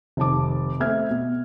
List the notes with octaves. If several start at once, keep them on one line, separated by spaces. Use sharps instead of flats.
F1 D#3 A5 D6
A3 C4 E5 F6 G#6
B2